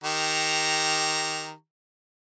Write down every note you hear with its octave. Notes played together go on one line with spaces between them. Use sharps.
D#3 G4 A#5